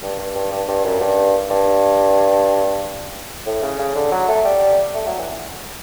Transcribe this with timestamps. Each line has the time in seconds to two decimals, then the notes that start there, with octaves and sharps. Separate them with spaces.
0.03 G2
0.19 G2
0.35 G2
0.51 G2
0.68 G2
0.84 F#2
1.01 G2
1.50 G2
3.46 A2
3.63 C#3
3.79 C#3
3.95 D3
4.12 F#3
4.28 A3
4.45 G3
4.94 A3
5.06 F#3
5.18 E3